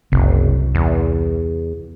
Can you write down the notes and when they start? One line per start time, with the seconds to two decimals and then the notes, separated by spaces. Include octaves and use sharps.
0.12 F#1 C2
0.75 E2